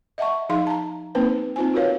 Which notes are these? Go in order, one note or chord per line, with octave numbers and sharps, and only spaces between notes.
D#5 E5 F#5 A5 C#6
F3 D#4 G#4 F5 C6
A5 A#5
A#3 C4 D#4 B4 C5 G5
C4 D#4 F4 C5 G#5
F4 F#4 A#4 B4 C#5 F5